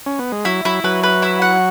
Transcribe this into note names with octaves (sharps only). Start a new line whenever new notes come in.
C#4
B3
G#3
F#3 E4
F#3 E4
F#3 B4
B4
E4
F#5